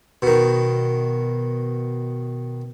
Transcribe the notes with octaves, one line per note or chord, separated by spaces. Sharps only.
B2 D#3